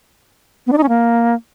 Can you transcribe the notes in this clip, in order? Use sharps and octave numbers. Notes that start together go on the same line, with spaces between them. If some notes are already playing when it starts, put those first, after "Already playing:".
B3
D4
D#4
C#4
A#3